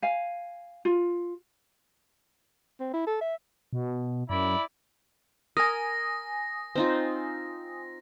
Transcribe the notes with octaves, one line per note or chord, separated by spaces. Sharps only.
F5 G#5
F4
C4
E4
A4
E5
B2
F#2 E4 D5 B5
A#4 G#5 D#6 A#6
C4 D#4 F4